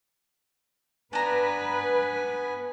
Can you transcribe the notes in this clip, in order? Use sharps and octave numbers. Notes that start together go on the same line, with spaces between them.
B3 D4 B4 G#5 A#5